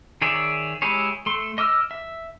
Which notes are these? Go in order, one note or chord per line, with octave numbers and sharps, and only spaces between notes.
D#3 G#4 C#5 D5 E5
G#3 E4 G4 G#4 C#5
A3 C6
D#5 D6 E6 F6
E5